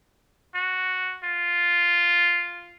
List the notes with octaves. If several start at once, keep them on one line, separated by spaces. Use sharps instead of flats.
F#4
F4